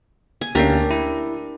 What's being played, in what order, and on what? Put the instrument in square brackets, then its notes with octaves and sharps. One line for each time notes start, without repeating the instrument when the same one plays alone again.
[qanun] G#5
[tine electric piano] D2 A#3 C#4 [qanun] D4 G4 A#4
[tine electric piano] E4